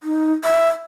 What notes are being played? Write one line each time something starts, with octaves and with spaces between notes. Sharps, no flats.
D#4
E5